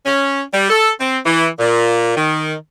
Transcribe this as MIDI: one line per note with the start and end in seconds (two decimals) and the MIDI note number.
0.06 0.43 61
0.54 0.68 55
0.70 0.91 69
1.00 1.19 60
1.26 1.47 52
1.60 2.15 46
2.17 2.55 51